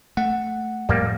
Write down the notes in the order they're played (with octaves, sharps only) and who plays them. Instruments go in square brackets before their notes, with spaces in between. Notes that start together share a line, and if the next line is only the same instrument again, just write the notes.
[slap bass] A3 [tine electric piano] F#5
[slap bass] F2 A2 [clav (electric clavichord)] G3 A#3